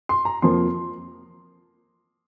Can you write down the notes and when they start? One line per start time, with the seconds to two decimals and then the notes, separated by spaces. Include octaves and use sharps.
0.09 C6
0.25 A#5
0.42 F2 C3 F3 A#3 C6